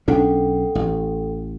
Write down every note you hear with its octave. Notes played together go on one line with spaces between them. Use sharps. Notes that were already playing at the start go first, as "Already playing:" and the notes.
B1 C#4 D4 A4 F#5 G5
A1